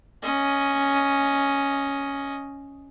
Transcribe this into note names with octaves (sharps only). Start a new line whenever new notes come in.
C#4 D#5